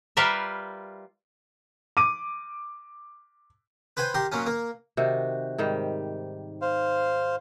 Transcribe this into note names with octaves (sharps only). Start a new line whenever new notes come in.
G3 F4 A#4 B4 E5
D6 D#7
B4 C5 G5 G#5
G4 A#4 C6
A#2 F#3 C#4
A#3
C3 D#3 F#4
G#2 D#3 G3
C5 F5